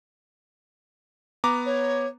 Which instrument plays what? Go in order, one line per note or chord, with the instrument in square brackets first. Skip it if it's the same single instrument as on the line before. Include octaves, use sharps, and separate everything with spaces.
[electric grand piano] B3 A#5 D6
[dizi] C#5